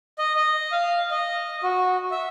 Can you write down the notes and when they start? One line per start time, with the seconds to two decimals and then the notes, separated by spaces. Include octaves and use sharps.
0.19 D#5
0.36 D#5
0.72 F5
1.11 D#5
1.63 F#4
2.11 E5